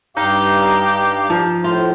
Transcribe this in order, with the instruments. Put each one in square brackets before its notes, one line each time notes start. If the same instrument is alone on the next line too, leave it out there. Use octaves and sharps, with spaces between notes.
[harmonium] G2 F5 [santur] D#4 [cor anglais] G4
[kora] F3
[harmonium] A2 [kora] F4 [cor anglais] C5